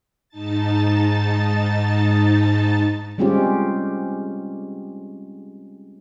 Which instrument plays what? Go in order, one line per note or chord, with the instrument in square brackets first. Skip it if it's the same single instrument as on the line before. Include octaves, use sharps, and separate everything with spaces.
[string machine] G#2 D#4 A5 A6
[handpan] G3 G#3 C4 C#4 F4 G4